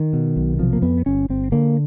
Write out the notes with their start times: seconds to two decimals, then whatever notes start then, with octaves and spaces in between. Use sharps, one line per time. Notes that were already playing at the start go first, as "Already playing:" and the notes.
Already playing: D#3
0.13 B2
0.36 B1
0.59 C3 F3
0.73 A#3
0.82 F2 B3
1.06 G1 C#4
1.29 G1 C4
1.52 D3 A#3